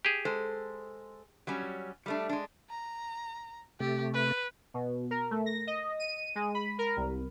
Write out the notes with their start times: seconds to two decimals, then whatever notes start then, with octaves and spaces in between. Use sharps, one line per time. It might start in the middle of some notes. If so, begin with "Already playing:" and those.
0.05 G4 G#4
0.25 G#3 A4 C5
1.47 F#3 G3 C#4
2.06 G3 A3 D4
2.29 G#3 D4
2.70 A#5
3.80 C3 A3 G4
4.14 B4
4.74 B2
5.11 A#4
5.31 A3
5.46 A#6
5.67 D#5
5.99 D#7
6.35 G#3
6.54 B5
6.78 A#4
6.97 C2